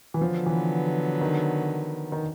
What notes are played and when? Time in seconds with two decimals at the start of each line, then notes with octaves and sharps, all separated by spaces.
0.14 E3
0.21 D3 F3 F#3 B3
0.46 E3
1.21 D#3
2.12 D#3